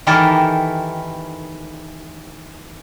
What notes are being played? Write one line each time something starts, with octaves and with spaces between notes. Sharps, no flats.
D#3 E3 E4 G4 A4 A#4